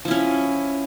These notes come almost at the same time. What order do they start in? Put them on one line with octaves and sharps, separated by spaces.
F3 E4 C#4